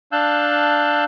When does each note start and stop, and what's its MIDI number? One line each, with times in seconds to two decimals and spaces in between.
0.12 1.04 62
0.12 1.04 77
0.12 1.04 81
0.12 1.04 88
0.12 1.04 90
0.12 1.04 91